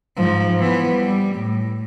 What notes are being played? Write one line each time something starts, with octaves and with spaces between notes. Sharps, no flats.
G#2 F3
E3 B3
G3
A2